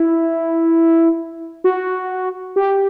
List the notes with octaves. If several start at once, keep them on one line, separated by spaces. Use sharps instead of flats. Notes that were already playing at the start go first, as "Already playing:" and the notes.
Already playing: E4
F#4
G4